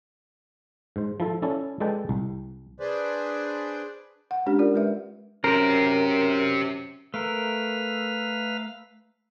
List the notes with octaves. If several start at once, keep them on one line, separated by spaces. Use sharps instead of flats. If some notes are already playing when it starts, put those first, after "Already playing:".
G#2 C5
F3 E4 A4
C#4 E4 A4 D5
G#3 A4 B4 D5 G5
C2
D4 G#4 B4 C5 D5
F#5
G#3 C#4 D4 G4
F4 A#4 D5
G#3 B4 E5
F#2 G4 A#4 C5
A3 A#4 B4 F5